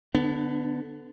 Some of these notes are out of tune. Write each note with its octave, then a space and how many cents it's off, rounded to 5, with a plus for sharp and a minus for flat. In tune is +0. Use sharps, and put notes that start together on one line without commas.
D3 +0 B3 +20 D4 +40